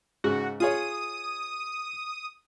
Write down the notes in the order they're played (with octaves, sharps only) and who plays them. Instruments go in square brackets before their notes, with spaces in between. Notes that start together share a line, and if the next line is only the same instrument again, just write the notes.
[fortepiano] G#2 C#3 [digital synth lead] F#4
[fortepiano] F4 G#4 C#5 [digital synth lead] D#6